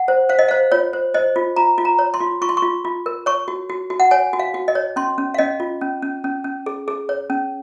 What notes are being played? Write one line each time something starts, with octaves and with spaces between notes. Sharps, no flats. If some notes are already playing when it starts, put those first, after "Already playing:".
Already playing: F#5
C5
C5 F5
D#5
C5 F5
F4 C#5
C5
C5 D#5
F4
F4 A#5
F4
A#5
C#5
C6
F4
F4 C#6
C6
C#6
F4
F4
A#4
C#5 C#6
F#4
F#4
F#4
F#5
C#5 G#5
F#4
F5
F#4
D#5
C#5
C#4 C6
C#4
F5
C#4 D#5
F4
C#4
C#4
C#4
C#4
G#4
G#4
C#5
C#4